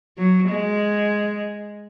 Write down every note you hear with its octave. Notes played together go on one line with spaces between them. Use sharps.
F#3
G#3